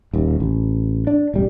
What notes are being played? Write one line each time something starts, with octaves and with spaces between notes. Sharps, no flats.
D#1 D#2
A1
D4
E1 A1 G3